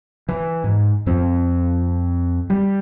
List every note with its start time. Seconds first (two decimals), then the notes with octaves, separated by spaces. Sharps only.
0.29 E3
0.64 G#2
1.06 F2 C4
2.50 G3